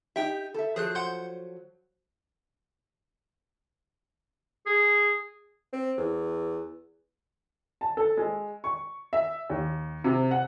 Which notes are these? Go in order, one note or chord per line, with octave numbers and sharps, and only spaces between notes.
D#4 G4 E5 G5
A4 E5
F3 F#3 G#4 C5 F#6
F#5 C6 G6
G#4
C4
E2
A5
A4
G#3
C#6
E5
D#2
C3
F#5